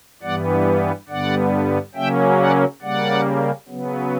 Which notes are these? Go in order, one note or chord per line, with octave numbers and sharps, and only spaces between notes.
G2 E3 G3 B3 D5 F#5
G2 D3 G3 B3 D5 F#5
C#3 F#3 A#3 C#4 E5 G5
D5 F#5
C#3 G3 A#3 D5 F#5
C#3 F#3 B3